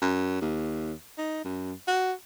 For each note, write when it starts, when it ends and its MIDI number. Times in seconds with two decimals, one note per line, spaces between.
0.01 0.41 42
0.41 0.93 39
1.18 1.43 63
1.44 1.73 42
1.87 2.12 66